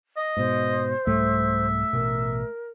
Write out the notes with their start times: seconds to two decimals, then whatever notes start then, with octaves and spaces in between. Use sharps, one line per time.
0.17 D#5
0.37 G#2 B2 C5
1.07 C2 G#2 G3 A3 E5
1.93 A1 B2 A#4